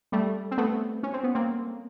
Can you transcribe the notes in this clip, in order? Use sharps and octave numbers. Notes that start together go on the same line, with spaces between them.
G3 A3
C4
A3 B3
C#4
C4
B3
A#3 C4